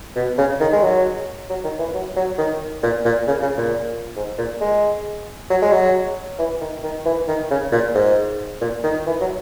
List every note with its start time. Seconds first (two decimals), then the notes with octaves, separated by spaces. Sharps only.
0.16 B2
0.38 C#3
0.60 D#3
0.73 G#3
0.83 F#3
1.49 F#3
1.64 D#3
1.79 E3
1.94 F#3
2.16 F#3
2.38 D#3
2.83 A#2
3.05 A#2
3.27 C#3
3.42 C#3
3.57 A#2
4.16 G#2
4.38 A#2
4.61 G#3
5.50 F#3
5.61 G#3
5.72 F#3
6.39 E3
6.61 D#3
6.83 D#3
7.05 E3
7.28 D#3
7.50 C#3
7.72 A#2
7.95 G#2
8.61 A#2
8.83 D#3
9.06 E3
9.21 F#3